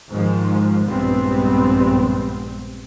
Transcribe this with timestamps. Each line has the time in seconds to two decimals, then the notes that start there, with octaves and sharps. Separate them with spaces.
0.10 G#2 D#3 F3 G#3
0.87 A#1 G2 G3 G#3 B3 C4